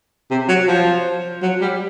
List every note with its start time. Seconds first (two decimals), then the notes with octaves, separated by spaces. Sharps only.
0.31 C3
0.48 F#3
0.68 F3
1.43 F#3
1.61 G3